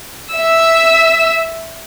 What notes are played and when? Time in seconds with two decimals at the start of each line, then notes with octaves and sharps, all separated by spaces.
0.35 E5 E6